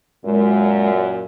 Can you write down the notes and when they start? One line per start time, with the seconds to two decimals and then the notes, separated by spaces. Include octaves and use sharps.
0.25 F#2 A#2 G#3